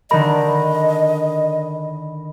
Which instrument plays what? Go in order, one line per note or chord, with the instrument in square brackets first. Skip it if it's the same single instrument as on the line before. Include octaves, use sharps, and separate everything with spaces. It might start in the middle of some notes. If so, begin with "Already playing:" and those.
[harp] D3 D#3 A#4 [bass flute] D#5 [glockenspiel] B5